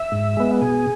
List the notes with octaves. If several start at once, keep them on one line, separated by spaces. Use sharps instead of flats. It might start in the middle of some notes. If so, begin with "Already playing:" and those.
Already playing: E5
G#2
G#3 B3
B2 G#4